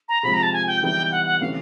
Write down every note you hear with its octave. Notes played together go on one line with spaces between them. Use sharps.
A#5
C3 F3 G#3 B5
A#5
A5
G#5
G5
E3 G3 B3 D#4 G5
F#5
F#5
C3 E3 A3 C#4 F5